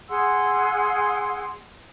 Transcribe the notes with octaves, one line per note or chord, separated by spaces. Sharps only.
G#4 F#5 C6 E6